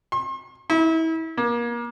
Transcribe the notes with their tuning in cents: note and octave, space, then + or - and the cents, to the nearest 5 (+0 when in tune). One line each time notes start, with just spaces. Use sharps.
C6 +45
E4 -30
A#3 +30